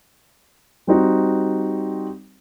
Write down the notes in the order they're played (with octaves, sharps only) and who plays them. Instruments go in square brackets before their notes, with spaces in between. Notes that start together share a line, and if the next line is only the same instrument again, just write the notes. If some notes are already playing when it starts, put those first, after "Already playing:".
[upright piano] G3 C4 D#4 F#4